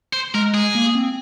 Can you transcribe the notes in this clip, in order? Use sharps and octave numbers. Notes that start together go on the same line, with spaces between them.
C5
G#3 A#4
G#4
A#3
C4